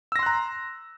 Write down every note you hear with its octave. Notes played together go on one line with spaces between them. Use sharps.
A#5 C6 E6 F#6 A#6